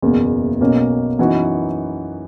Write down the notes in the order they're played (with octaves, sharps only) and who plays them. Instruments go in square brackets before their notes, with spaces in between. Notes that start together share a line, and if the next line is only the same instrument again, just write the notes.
[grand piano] F#1 E2 B2 A#3
B1 B2 A#3 C#4
F#2 E3 B3 D#4 F#4